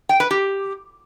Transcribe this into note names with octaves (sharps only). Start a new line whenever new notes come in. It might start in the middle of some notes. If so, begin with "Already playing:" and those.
G5
B4
G4